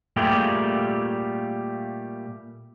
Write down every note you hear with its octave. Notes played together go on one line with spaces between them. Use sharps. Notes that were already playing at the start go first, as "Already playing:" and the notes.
A#2 G3 A3 F4 G4 G#4